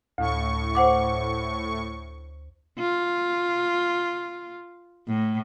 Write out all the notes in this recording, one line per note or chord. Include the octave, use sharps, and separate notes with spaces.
D2 A2 C#6
C5 F#5 D6
F4
A2